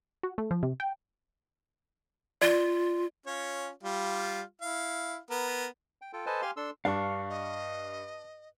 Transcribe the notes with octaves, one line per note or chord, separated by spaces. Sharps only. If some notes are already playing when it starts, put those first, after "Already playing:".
F#4
A3
F3
C3
G5
F4 D5
C#4 F4 C#5
G3 F4
E4 F5
B3 A#4
G5
F4 A4 G5
A4 B4 C5 D#5 G#5 A5
G4 F5 G#5 C6 F6
D4 A4 C6 E6
G2 D4 F5 C#6
D#5